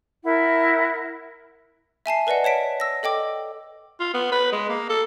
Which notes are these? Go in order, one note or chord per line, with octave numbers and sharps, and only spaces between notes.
E4 A#4 F#5
E5 G#5 A5 C7
A#4 B4 D5 D#5 F#5
C#5 A5 B6 D7
E6 A#6
A4 D#5 G5 D6
F4
B3
B4
G#3
A#3
A4